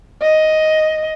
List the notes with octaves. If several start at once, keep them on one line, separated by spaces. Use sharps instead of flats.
D#5